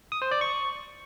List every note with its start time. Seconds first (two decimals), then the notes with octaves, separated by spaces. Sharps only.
0.12 D#6
0.22 C5
0.31 D5
0.41 C#6